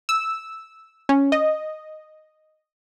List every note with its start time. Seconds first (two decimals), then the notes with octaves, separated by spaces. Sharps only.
0.09 E6
1.09 C#4
1.32 D#5